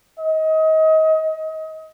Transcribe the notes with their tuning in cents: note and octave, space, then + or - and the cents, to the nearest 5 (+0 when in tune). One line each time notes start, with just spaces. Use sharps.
D#5 +30